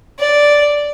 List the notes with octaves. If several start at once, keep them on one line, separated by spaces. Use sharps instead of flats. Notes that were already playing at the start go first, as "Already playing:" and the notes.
D5